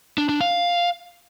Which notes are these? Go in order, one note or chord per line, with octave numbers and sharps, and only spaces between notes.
D4
D4
F5